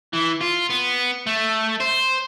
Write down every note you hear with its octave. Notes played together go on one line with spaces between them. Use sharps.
E3
F4
B3
A3
C5